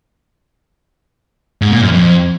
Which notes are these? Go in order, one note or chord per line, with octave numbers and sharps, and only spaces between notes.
G#2
A#2
F#2
F2